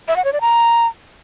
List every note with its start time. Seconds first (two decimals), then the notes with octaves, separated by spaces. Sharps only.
0.08 E5
0.16 F#5
0.25 C#5
0.33 D5
0.41 A#5